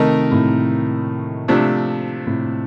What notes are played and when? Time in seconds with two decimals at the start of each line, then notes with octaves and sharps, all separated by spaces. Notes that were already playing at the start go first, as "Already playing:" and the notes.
Already playing: C3 D#3 A3 D#4 A#4
0.31 A2 C3
1.48 C3 F3 A3 D4
2.27 A2 C3